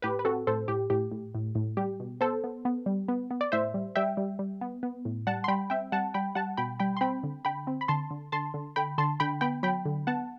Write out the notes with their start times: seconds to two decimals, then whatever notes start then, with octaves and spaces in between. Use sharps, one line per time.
0.02 A2 G4 B4
0.19 B4
0.25 C4 F#4 A4
0.47 A2 A4 C5
0.68 A2 G4
0.90 A2 G4
1.12 A2
1.35 A2
1.55 A2
1.77 G3 G4
2.00 B2
2.21 B3 A4 C5
2.44 B3
2.65 B3
2.86 G3
3.08 B3
3.31 B3
3.41 D5
3.52 A2 C5 E5
3.74 G3
3.95 G3 E5 G5
4.17 G3
4.39 G3
4.61 B3
4.83 B3
5.05 A2
5.27 G3 F#5 A5
5.44 C6
5.48 G3 G5 B5
5.70 C4 E5 G5
5.92 G3 F#5 A5
6.14 G3 G5 B5
6.35 G3 F#5 A5
6.57 B2 G5 B5
6.80 G3 G5 B5
6.97 C6
7.01 C4 G5 B5
7.23 D3
7.45 D3 G5 B5
7.67 C4
7.81 B5
7.88 D3 A5 C6
8.11 D3
8.32 D3 A5 C6
8.54 D3
8.76 D3 G5 B5
8.98 D3 A5 C6
9.20 D3 G5 B5
9.41 B3 G5 B5
9.63 F#3 G5 B5
9.85 D3
10.07 B3 F#5 A5